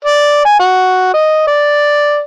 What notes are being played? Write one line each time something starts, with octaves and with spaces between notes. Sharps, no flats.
D5
G#5
F#4
D#5
D5